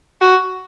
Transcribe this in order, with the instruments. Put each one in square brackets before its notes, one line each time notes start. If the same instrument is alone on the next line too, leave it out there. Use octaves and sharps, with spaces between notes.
[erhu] F#4